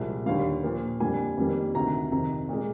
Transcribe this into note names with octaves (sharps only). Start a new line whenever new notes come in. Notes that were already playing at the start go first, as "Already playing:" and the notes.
Already playing: C2 A#2 F3 G#3
D#2 D3 G3 F5
A#2 F3 A#3
F2 D3 G3 A#3 G#5
F2 D#3 G3 A#3
D2 C3 D#3 A#5
F2 C3 D#3 A#5
A#2 G#3